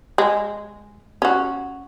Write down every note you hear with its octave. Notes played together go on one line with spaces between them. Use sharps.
G#3
C#4 F#4